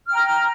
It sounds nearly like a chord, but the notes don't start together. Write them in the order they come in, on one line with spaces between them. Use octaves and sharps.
F6 G5 A#5